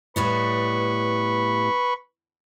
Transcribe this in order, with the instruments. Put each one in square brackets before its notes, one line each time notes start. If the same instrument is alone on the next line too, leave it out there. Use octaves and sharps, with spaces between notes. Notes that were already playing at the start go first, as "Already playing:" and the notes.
[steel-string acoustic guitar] A2 G3 B3 [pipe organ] B4 B5 C#6